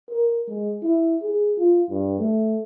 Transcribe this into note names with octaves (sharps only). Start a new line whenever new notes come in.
A#4
G#3
E4
G#4
F4
G2
A3